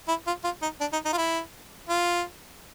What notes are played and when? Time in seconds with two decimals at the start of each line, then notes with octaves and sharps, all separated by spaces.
0.08 E4
0.27 F4
0.44 F4
0.62 D#4
0.81 D4
0.93 D#4
1.05 D#4
1.13 F4
1.17 E4
1.89 F4